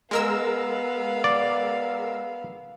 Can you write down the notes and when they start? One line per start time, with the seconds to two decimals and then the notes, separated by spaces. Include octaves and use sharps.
0.11 G#3 B3 A#4 F5 E6
1.24 D5